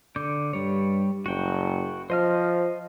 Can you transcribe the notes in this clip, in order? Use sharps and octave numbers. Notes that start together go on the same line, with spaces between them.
D3 D6 G6
G2 G3 C#5
F#1 F#4 G5
F3 C5 D#5 F6